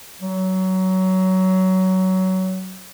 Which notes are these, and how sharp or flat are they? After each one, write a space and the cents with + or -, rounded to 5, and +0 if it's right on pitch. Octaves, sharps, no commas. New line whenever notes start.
F#3 +20